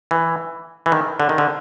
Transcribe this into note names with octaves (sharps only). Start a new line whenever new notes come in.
E3
E3
D#3
D3
D#3
D3